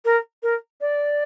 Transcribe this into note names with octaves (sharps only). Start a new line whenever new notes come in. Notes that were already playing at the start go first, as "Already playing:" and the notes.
A#4
A#4
D5